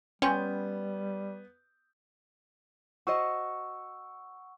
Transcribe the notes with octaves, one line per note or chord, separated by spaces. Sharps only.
G3 B3 C#4 G5 C6 G6
F#4 C5 D#5 F#5 C#6 E6